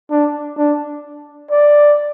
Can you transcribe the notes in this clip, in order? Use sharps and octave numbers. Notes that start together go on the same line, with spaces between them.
D4
D4
D5